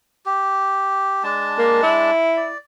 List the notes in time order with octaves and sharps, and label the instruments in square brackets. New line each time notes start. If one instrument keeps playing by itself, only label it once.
[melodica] G4
G#3 D4 A5
[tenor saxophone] A#3
E4
[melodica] D5